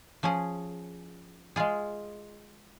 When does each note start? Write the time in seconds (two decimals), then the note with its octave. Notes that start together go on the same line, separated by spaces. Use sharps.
0.23 F3 C#4 G#4
1.56 G#3 F4 G#4